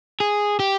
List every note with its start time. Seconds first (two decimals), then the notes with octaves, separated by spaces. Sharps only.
0.20 G#4
0.60 G4